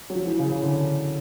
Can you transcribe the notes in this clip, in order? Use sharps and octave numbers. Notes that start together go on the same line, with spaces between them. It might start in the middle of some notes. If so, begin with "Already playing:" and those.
F#3
F3
E3
C#3
C#3
D3